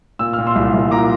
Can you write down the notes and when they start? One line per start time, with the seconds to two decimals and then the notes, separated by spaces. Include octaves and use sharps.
0.19 A#2 E6
0.33 A#2 F6
0.47 C6 E6
0.56 C2
0.74 C2
0.91 A#2 A#5 D6